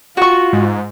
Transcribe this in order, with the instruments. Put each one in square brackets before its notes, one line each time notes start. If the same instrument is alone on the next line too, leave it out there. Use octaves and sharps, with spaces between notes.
[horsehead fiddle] F4 [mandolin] F#4 C#6
[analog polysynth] G#2